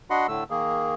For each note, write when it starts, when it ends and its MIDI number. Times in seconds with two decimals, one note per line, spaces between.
0.10 0.27 62
0.10 0.27 66
0.10 0.27 75
0.10 0.27 78
0.10 0.27 83
0.10 0.27 84
0.28 0.44 45
0.28 0.44 50
0.28 0.44 57
0.28 0.44 88
0.50 0.95 51
0.50 0.95 58
0.50 0.95 68